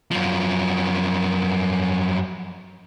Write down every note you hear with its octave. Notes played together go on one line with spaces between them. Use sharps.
F#2 F3